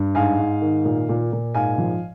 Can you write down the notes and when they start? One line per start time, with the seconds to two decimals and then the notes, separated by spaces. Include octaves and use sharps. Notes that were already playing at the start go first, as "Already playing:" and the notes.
Already playing: G2
0.15 G#2 F5 G#5
0.38 G#2
0.61 D#3
0.85 A#2
1.09 A#2
1.32 A#2
1.55 G#2 F5 G#5
1.78 F3